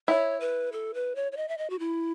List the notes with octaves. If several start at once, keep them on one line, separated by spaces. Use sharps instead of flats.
E4 C#5
B4
A4
B4
C#5
C#5
D#5
E5
D#5
F#4
E4